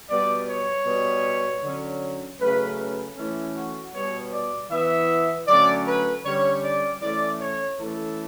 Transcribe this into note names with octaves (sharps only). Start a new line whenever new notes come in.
B2 G3 B3 D5
C#5
B2 G3 B3
D3 F#3 C#4
C#3 F#3 A3 C#4 B4
B4
E3 A3 C#4 A4
F#4
B2 G3 B3 C#5
D5
E3 B3 E5
D3 F#3 A3 C#4 D5
B4
D3 G3 C#4 C#5
D5
E3 A3 C#4 D5
C#5
E3 A3 C#4 A4